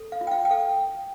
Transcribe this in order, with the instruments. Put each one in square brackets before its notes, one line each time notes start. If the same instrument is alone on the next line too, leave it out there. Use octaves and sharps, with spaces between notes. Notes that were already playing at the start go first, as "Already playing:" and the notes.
Already playing: [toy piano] A4
F5
F4
G5
F5
G5
A4 F5